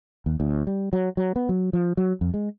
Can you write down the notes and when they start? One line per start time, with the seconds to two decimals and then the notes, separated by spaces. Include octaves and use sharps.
0.26 D#2
0.40 D2
0.67 G3
0.93 F#3
1.17 F#3
1.36 B3
1.49 F#3
1.73 F3
1.97 F#3
2.21 F2
2.34 G#3